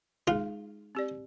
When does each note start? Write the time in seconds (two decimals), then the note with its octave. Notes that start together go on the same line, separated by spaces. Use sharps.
0.27 G#3 D#4 F4 G#4
0.95 C4 G4 D5